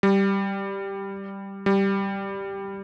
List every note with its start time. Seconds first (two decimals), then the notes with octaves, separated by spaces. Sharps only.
0.03 G3
1.66 G3